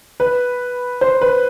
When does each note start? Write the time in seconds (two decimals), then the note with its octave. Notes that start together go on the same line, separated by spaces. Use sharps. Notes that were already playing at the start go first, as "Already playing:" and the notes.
0.20 B4
1.01 C5
1.22 B4